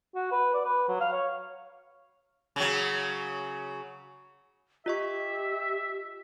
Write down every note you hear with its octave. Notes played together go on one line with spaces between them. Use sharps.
F#4
B4
D5
B4
F#3
F5
C#5
C#3 F#3
F4 G4 D#5 E5 C#6